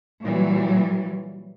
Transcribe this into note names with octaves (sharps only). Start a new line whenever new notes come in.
A#2 E3 F#3 G3